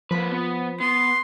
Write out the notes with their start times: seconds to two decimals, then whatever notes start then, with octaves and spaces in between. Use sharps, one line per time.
0.11 F3 A#3 B4 B5
0.32 B3
0.80 B3 C6